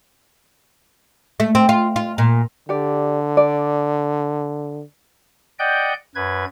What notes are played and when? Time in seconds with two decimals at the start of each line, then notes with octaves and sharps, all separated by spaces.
1.40 A3
1.55 C4
1.69 F4
1.96 F4
2.18 A#2
2.69 D3 G4 D5
3.37 D5
5.59 D5 D#5 F#5 G5 G6
6.15 F#2 B4 G#6